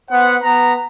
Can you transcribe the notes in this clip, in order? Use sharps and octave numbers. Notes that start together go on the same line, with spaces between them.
B3 C5 F#5
B3 A#5